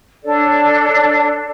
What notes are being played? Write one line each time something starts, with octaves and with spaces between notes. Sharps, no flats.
D4 A4 C#5 D5